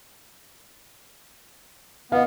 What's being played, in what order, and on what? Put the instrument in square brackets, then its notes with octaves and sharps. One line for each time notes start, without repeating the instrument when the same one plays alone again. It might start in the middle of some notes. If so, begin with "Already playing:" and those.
[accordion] B3 [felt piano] D#5 F5